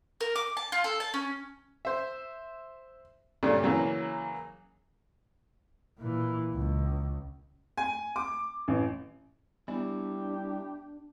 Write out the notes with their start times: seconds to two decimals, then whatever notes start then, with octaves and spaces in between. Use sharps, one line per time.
0.21 A#4
0.36 D6
0.57 A5
0.72 F4
0.84 A4
1.00 A5
1.14 C#4
1.85 C5 E5
3.43 G2 A#2 C#3 G3 A3 C#4
3.63 C#3 E3 F#3 A#3
5.99 A#2 E3
6.54 C#2
7.77 G#5
8.16 D6
8.68 A1
9.68 G3 B3 D4 E4 G4